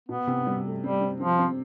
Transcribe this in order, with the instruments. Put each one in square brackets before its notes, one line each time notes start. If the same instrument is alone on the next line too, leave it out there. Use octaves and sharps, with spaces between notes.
[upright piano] B2 [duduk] B3
[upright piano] C3
G3
A3
[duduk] G3 [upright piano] C4
[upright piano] C4
[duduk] F3 [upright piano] C4
[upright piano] C4